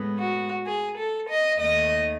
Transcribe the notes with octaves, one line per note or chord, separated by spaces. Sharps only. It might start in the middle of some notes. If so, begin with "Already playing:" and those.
Already playing: A2 G#3 B3
F#4
G#4
A4
D#5
D#2 D#3 A3 D#5